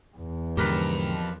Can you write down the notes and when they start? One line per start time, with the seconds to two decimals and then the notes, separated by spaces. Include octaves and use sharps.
0.17 E2
0.57 F2 G#2 D3 G4 A#4 B4